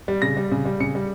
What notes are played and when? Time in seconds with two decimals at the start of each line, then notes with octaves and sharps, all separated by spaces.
0.08 G3
0.22 C#3 A#6
0.37 G3
0.51 C#3
0.65 G3
0.80 C#3 C#7
0.95 G3